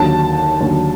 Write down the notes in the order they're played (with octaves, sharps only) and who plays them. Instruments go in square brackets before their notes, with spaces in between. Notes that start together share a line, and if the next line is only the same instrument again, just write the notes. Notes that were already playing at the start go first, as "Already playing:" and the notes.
Already playing: [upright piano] D#2 D3 F#3 A5
D#2 D3 F#3